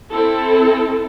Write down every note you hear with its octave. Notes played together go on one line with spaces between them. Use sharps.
C4 E4 A4